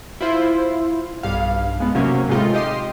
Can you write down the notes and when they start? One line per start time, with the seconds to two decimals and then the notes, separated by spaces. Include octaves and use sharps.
0.21 E4 F4 C5
1.23 B1 G2 F5
1.80 G#3 B3
1.95 C3 F#3 A#3 C#4
2.29 A2 C3 G#3 C4 D#4 F4
2.54 G4 D#5 C6